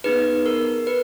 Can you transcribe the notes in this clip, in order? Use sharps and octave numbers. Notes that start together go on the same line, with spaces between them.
B3 D#4 G#4 B4
A#4
B4